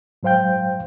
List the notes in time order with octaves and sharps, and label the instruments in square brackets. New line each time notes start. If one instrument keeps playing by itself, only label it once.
[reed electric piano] G#2 F#3 C5 F5 G5 G6